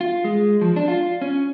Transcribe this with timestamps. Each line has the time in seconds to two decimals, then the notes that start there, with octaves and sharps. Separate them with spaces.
0.01 F4
0.24 G#3
0.61 F3
0.76 D4
0.88 F4
1.22 C#4